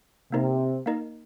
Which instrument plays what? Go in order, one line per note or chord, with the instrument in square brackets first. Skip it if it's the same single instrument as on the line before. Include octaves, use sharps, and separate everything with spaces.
[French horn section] C3 [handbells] A#3 D#4 A#4 D#5
[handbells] A#3 D#4 A#4 D#5